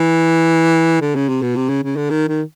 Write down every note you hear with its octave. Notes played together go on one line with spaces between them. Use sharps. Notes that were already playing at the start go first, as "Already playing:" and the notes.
Already playing: E3
D3
C#3
C3
B2
C3
C#3
C#3
D3
D#3
D#3